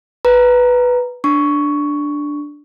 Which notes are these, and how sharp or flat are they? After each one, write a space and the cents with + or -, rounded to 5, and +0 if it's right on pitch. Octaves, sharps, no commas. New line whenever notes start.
B4 +0 A#5 +0
D4 +0 C#6 +10